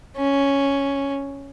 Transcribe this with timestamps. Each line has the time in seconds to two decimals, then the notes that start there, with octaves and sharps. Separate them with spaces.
0.17 C#4